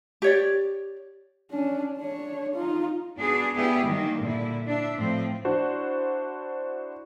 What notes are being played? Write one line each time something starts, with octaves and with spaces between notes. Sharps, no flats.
G4 C#5 D5
C#4 D4
D4 C#5
D#4 F4
B3 D4 F#4 G#4
B3 D4 E4 G4 G#4
D#3 F#3 G3 A#3
A#2 D3 E4
D4 E5
A2 F3 C4
D4 E4 F#4 C5